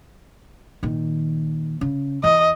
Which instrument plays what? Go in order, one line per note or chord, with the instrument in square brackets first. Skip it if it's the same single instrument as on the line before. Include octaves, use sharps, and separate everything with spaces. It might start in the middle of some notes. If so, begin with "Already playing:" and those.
[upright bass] A#2 D#3
C#3
[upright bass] E2 [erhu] D#5